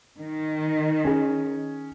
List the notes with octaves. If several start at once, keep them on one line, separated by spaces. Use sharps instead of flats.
D#3
C#4 G#4